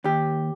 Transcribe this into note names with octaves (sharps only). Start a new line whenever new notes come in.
D#2 G4